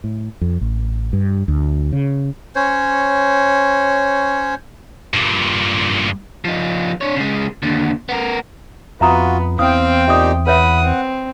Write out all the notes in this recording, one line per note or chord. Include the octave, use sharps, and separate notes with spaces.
A2
F2
A1
G2
D2
C#3
C#4 C5 C#5
G2 A#2
F3 D#4
D4 C#5
C#3 G#3
D#2 D3
B3 A#4
F2 B3 F4 F#4 E5 A#5 D#6
E2 C4 E5 F5 G5 D#6
A#2 D#4 G4 E5 D#6
B4 C#5 E5 F#5 B5 D#6
C4